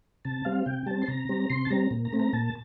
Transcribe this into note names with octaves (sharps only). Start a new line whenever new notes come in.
C3 A5
G3 C4 F5
C3 G5
G3 C4 A5
C6
C3 A#5
G3 C4
C3 C6
A5
G3 C4 A#5
A#2
A#5
A3 C4
A#5
A#2 A5